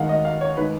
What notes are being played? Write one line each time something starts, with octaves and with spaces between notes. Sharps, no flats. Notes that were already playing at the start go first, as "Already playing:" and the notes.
Already playing: D#2 D#3 G#3 F5 F#5
D#5
F5
C#5
D#3 G#3 B4